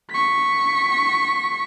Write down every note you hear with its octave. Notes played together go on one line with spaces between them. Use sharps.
C#6 B6